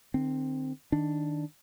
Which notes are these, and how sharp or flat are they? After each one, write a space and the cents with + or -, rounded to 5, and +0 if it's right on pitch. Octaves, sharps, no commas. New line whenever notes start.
D#3 -45 C4 +0
D#3 +0 D4 +0